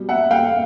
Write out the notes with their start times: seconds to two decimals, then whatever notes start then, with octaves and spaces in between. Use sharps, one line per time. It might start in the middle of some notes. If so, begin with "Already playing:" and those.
Already playing: B2 G3
0.09 E5 F#5
0.31 F5 G5